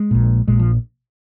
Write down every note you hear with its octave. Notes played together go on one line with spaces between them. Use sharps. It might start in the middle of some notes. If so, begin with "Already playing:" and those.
Already playing: G#3
A#1 A#2
A#1 A#2 G#3
F3